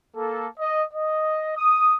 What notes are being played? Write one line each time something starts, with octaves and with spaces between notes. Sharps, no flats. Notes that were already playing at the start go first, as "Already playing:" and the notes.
A#3 A4
D#5
D#5
D#6